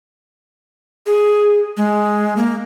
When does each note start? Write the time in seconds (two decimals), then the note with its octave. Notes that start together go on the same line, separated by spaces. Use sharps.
1.07 G#4
1.77 G#3
2.37 A#3